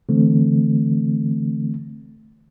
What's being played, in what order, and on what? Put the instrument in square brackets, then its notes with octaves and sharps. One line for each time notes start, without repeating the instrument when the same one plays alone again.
[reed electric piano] D3 E3 A3 C4